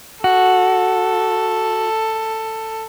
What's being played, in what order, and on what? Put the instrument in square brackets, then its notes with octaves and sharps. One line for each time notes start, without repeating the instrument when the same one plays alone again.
[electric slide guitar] F#4 [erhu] A4